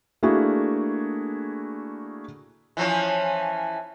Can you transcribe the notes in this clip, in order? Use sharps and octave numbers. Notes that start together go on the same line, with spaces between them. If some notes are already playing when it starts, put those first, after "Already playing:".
A3 A#3 D4 E4 F#4 G#4
E3 F3 C#4